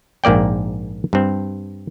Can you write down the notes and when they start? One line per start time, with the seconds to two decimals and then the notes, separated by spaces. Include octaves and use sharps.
0.24 A#1 G#2 A#3 D5 G5
1.13 G2 C4